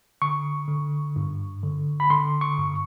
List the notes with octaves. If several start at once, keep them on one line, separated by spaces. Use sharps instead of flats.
D3 C#6
D3
G2
D3
B5
D3 C6
C#6
G2